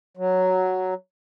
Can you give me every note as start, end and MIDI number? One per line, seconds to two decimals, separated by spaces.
0.17 0.94 54